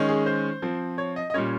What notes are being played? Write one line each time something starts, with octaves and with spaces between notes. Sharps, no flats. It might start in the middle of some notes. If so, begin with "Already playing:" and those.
Already playing: D#3 G#3 C#4
G#4
C5
F3 C4
C#5
D#5
D#5
A#2 G3 C#4 C#5